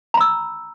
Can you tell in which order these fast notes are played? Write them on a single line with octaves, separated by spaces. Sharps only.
A#5 B5 E6